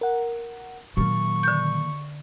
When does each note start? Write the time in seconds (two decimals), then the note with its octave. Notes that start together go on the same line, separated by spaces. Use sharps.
0.01 A#4 F#5
0.97 A#2 D#3 F#3 A#3 C#6
1.43 D3 G6